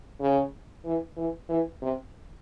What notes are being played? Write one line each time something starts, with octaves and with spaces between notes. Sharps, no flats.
C#3
E3
E3
E3
C3